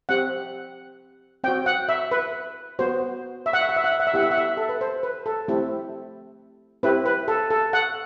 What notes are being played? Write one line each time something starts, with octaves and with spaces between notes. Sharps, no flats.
C4 G4 F#5
C4 F#4 G5
F#5
E5
B4
B3 F#4 C5
E5
F#5
E5
F#5
E5
F#5
E5
F#5
E5
B3 E4 G4 F#5
E5
F#5
E5
A4
B4
C5
B4
A4
A3 C4 E4 G4
C4 E4 G4 B4
B4
A4
A4
F#5